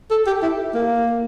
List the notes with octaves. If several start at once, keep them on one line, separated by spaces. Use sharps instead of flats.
A4
G4
E4
A#3